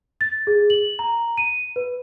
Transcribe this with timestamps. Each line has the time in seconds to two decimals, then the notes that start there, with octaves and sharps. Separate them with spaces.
0.21 A6
0.47 G#4
0.70 F#7
0.99 A#5
1.37 D#7
1.76 B4